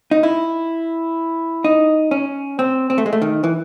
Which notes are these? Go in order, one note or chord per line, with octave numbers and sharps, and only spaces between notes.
D#4
E4
D#4
C#4
C4
C4
A3
G#3
A3
D#3
E3